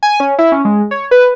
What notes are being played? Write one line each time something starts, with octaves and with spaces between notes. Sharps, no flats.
G#5
C#4
E4
C#4
G#3
C#5
B4